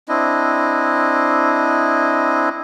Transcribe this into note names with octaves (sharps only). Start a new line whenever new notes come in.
C4 D4 E4 D#5